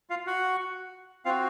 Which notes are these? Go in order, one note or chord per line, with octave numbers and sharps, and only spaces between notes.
F4 F5
F#4 F#5
C4 F4 F#4 F5